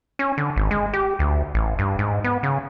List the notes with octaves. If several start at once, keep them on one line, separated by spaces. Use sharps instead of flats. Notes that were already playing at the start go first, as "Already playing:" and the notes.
C#4
D3
G#1
G#3
G4
D2
A1
G2
G#2
B3
C#3